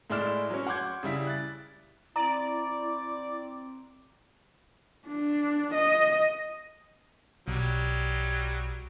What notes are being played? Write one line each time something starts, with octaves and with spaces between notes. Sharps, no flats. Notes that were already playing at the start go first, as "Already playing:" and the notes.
A2 G#3 E4 D5 F6 E7
F#3 C#4
F#5 C6 D6 G6 G#6
C#3 G3 E4 B6
F#6 A6
C4 E4 D5 A#5
D4
D#5
B1 F#3 G3